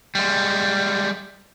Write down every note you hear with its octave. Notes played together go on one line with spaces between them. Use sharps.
G3 G#3